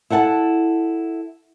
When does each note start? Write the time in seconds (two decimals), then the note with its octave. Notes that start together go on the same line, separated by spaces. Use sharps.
0.10 E4 A4 F#5 G#5 A5